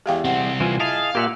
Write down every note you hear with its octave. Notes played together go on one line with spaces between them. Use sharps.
E2 G#3 G4 F5 G5
C2 C4 F#5
E3 F4 C5 G#5
E4 G#4 D#5 F5 A5
A#2 A#3 G4 E5 F#5